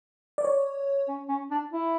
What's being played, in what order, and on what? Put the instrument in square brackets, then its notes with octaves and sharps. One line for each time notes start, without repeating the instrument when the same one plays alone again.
[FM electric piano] D5
C#5
[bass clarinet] C#4
C#4
D4
E4